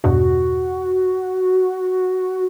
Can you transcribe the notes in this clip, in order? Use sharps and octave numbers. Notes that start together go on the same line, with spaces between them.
E2 G2 B2 F#4